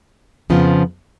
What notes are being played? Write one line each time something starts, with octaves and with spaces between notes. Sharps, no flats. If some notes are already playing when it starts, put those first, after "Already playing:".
F2 C#3 F3 B3 F4